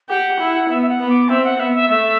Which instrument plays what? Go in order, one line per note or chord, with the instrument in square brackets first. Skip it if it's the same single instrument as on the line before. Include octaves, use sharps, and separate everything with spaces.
[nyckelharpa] G4 [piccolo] F#5
[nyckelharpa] E4
[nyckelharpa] B3 [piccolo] E5
[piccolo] E5
F#5
[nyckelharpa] B3
[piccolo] D6
[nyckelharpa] C4 [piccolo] E5
[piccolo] F#5
[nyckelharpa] B3 [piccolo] E5
[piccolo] E5
[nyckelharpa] A3 [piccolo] E5